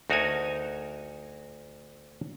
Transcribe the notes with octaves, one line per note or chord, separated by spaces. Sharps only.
D2 D#4 F#4 A#4 C#5 G#5